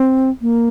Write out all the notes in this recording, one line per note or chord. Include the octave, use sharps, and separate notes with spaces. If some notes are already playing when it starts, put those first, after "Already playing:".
Already playing: C4
A#3